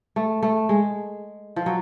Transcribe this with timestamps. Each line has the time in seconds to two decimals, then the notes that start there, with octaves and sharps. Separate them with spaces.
0.16 A3
0.43 A3
0.69 G#3
1.56 F3
1.66 F#3